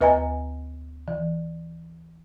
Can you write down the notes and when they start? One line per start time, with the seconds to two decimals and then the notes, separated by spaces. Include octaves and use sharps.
0.01 D2 B4 D#5 G#5 A#5
1.08 E3